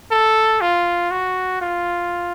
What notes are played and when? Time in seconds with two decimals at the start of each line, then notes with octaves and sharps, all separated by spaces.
0.11 A4
0.61 F4
1.11 F#4
1.61 F4